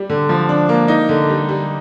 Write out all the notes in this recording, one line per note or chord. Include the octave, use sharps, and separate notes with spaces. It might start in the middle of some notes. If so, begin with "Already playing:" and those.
Already playing: G3
D3
F3
D4
A#3
D#4
D3
G3
G3